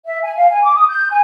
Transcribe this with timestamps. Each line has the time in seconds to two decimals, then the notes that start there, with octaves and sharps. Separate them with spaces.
0.06 E5
0.22 G#5
0.36 F5
0.50 G#5
0.62 D6
0.75 D#6
0.89 G6
1.10 G#5